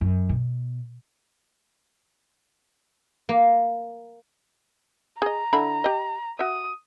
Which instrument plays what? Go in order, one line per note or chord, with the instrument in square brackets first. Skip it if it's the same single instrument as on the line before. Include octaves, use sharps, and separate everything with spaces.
[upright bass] F#2
B2
[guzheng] A#3
[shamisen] G#4 D#5 [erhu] A#5
[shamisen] D3 E4 B5
G4 D#5
[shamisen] F#4 E5 [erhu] D#6